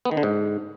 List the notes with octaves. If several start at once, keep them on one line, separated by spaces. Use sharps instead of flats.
B3
D#3
D3
G#2